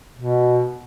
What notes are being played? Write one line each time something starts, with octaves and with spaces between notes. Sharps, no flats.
B2